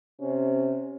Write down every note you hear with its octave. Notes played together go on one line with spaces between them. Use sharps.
C3 C#4